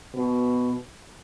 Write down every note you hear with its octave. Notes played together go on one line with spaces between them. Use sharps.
B2